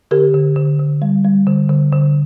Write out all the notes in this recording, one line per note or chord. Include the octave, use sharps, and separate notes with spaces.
D3 G4 A#4
D3
D3
D3
G3
G3
D3
D3
D3